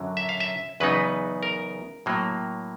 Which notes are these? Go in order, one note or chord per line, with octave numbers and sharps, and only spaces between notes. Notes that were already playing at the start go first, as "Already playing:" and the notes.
Already playing: F#2 D3 F#3
E5
F5
E5
E2 C#3 F#3 B3 D#4 B4
A#4
A2 F#3 A#3